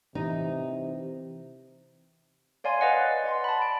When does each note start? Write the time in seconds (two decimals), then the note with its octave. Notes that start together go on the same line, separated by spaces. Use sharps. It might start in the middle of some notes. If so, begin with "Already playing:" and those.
0.15 C3 E3 D#4
2.64 C#5 D5 F5 G#5 C6
2.81 B4 D#5 F#5
3.24 D5 F#5 C6
3.44 A5 B5
3.62 D7